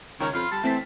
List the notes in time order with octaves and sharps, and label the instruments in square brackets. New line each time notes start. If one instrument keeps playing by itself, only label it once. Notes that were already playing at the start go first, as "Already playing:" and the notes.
[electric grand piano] C#2 C#5 A#5 [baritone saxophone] D#3 [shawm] C#4
[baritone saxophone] F2 [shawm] F4 [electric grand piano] B5 C6 F6
[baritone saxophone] G3 [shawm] A5
[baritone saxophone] E3 [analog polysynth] A3 C4 [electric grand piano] A6 B6